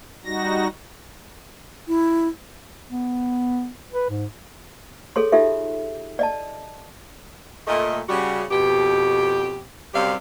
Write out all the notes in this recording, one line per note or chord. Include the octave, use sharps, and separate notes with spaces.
G3 D#4 F#4 A#6
E4
B3
B4
G#2
G#4 A4 C#5 C6
D#4 F4 G4 A4 E5
D5 D#5 A5
A#2 A3 D#5
C#3 G3 F#4
F2 B2 G4
F#2 C3 G3 C4 G4 F5